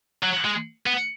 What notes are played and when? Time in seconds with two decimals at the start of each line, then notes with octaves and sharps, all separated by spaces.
0.23 F#3
0.44 G#3
0.86 B3